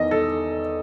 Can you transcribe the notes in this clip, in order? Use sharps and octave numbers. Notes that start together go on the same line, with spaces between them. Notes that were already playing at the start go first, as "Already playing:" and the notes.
Already playing: E2 D#3 D#5
A4